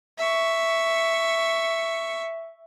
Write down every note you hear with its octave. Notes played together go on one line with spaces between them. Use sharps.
E5 C#6